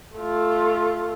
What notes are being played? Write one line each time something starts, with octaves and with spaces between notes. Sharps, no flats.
A3 F4